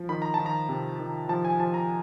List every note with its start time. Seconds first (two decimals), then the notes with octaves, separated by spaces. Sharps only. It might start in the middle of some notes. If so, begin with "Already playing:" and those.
Already playing: F3
0.09 D#3 B5
0.22 A#5
0.34 A5
0.40 D#3
0.46 A#5
0.69 C3
1.00 D#3
1.29 F3 A5
1.45 G#5
1.60 F3 A5
1.74 A#5